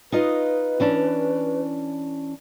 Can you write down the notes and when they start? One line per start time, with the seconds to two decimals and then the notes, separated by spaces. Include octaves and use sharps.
0.12 D#4 F4 B4 D#5
0.80 E3 C#4 D4